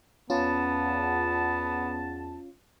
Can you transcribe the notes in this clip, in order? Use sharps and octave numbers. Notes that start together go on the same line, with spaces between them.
E2 B3 C#4 F4 A5